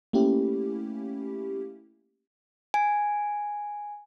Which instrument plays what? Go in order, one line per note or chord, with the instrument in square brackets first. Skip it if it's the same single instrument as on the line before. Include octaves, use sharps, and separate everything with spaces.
[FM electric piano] A3 A#3 C#4 E4 G4
[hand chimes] G#5